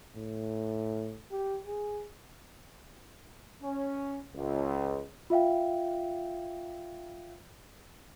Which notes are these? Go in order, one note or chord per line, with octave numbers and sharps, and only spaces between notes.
A2
G4
G#4
C#4
C#2
F4 E5 F5 G5